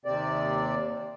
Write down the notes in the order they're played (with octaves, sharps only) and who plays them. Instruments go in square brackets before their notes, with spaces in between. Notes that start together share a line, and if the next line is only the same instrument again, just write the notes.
[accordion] D#2 C3 C4 D5